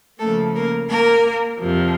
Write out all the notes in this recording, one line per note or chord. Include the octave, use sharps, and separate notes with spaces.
C#3 F3 A3 A#3 A4
A#3 A#4
A#3 A#4
F2 C3 F3